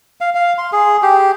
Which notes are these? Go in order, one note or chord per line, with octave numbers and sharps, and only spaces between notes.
F5
F5
C6
G#4
G4